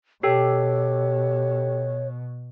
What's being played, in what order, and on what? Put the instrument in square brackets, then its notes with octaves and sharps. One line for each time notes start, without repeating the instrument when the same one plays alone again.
[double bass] B2 [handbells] G4 A4 G5 [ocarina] C#5